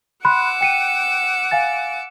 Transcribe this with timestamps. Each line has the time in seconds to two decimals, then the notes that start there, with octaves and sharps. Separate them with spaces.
0.25 F#5 B5 C6 D6 E6 F#6
0.61 G5 C#7 D#7
1.51 F5 G#5 A6